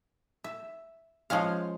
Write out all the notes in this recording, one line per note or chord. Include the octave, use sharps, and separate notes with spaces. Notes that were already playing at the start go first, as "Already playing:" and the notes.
E5
F3 G#3 C#4 F5